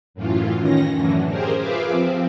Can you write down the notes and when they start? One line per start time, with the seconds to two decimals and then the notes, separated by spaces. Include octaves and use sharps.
0.14 F#2 A2 E3 F4
0.58 D#3 C#4 A#6
0.94 F#2 A2 D3 E3
1.27 G4 G#4 A#4 C5
1.58 F4 G#4 B4 E5 F5 D6
1.86 F3 C4